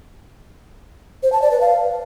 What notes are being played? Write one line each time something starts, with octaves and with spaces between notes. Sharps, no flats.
C5
A5
D5
B4
F5